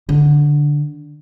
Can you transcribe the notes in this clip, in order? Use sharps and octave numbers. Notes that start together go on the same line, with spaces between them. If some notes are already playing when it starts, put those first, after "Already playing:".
D3